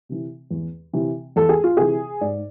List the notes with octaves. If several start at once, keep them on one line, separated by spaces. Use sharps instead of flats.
C3 E3
E2
C3 E3
E2 A4
G#4
F4
C3 E3 G#4
G#2 D5